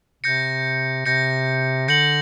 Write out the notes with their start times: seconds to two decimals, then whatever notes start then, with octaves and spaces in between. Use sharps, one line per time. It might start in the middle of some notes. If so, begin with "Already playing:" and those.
0.24 C3 G6 A#6 C#7
1.06 C3 G6 A#6 C#7
1.88 D3 G6 A#6 C#7 F#7